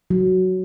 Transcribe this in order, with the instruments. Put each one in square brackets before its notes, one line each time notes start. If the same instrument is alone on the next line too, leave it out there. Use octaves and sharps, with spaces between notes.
[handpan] F#3